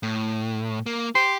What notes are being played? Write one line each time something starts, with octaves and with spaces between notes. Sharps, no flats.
A2
A#3
G4 C6